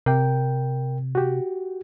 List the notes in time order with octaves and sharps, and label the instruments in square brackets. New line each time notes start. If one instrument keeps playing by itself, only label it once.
[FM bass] C3 [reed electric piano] A#4 G5
[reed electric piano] F#4 G4